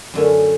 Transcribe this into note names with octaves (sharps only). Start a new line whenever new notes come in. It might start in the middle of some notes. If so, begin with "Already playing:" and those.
F#2 D3 A3 C#4